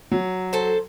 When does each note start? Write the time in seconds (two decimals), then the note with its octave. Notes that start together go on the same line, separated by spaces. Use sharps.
0.12 F#3
0.53 A4 C5